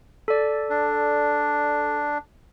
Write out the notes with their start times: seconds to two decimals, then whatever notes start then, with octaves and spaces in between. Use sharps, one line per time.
0.28 A4 D5
0.70 D4